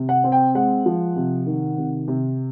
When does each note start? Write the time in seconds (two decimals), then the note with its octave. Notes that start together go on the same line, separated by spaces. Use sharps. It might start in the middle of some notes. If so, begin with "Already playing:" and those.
Already playing: C3
0.09 F#5
0.24 C4
0.32 G5
0.55 G#3 F#5
0.86 F3
1.16 C3
1.46 D#3
1.78 C3
2.08 C3